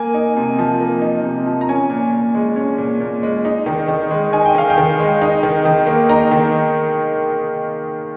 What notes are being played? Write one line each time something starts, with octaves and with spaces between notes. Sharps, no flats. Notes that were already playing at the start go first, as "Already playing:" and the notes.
Already playing: A#3 G#5
D#4
C3
F3
A#3
D#4
C3
F3
A#5
C#4 G#5
A#2
A#2
G#3
C#4
A#2
A#2
G#3
D#4
D#3
D#3
G#3
D#4 G#5
G5
D#3 F5
G5
D#3
G#3
D#4
D#3
D#3
A#3
D#4 A#5
D#3